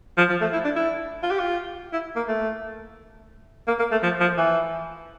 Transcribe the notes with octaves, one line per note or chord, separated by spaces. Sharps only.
F3
F3
A3
E4
D4
E4
F4
G4
F4
E4
A#3
A3
A#3
A#3
A3
F3
F3
E3